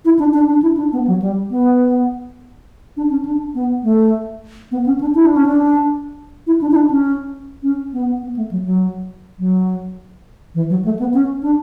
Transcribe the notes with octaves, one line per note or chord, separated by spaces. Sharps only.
E4
D4
D4
D4
E4
D4
B3
F#3
G3
B3
D4
C#4
D4
B3
A3
B3
C#4
D4
E4
D4
C#4
D4
E4
D4
E4
D4
C#4
C#4
B3
B3
A3
F#3
F#3
F#3
E3
F#3
A3
B3
C#4
D4